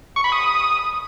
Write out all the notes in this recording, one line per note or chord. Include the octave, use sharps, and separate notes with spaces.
C#6
B5
D#6